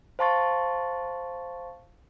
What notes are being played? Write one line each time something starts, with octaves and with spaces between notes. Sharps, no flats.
C5 F5 A5 C6 C#6 A6